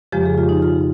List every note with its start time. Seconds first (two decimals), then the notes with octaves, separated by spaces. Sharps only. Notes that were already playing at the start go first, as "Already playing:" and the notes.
0.12 F2 C#3 F3 G#3 G4
0.26 G#4
0.38 F4
0.49 D#4
0.62 F4